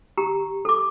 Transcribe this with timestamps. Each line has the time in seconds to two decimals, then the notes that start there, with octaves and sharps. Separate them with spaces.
0.18 G4 A#5
0.65 A4 D6